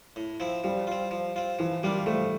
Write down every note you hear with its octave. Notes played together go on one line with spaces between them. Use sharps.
A2
F3 C4 E4
F3 G3
C4 F4
F3
C4 F4
E3 F3
G3 A#3 D4 F4
F3 A3